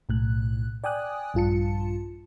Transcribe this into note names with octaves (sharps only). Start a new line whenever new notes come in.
B1 A2 F#6
D5 G5 G#5 D#6 F#6
A#1 G2 F4 A5 C#7